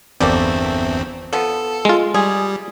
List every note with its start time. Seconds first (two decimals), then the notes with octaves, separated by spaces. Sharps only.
0.20 G1 E2 G3 A3 A#3 C4
1.33 F3 B3 A4
1.85 G#3 F4
2.14 G3 G#4